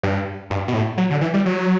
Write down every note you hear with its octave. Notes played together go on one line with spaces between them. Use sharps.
G2
G2
B2
A2
F#3
D3
E3
G3
F#3